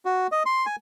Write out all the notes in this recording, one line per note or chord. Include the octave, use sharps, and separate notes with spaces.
F#4
D#5
C6
G#5